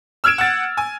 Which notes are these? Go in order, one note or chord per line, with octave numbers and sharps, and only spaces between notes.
E6 F6 G#6 D7 E7
F#5 A6
G#5